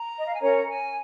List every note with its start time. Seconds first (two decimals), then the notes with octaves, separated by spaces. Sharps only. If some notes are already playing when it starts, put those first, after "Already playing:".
Already playing: A#5
0.18 D#5
0.26 F5
0.33 G#5
0.40 C#4 A#4 C#5 A#5
0.68 G#5